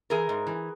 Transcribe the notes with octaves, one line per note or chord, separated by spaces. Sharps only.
E3 G#4 A#4
G#2
E3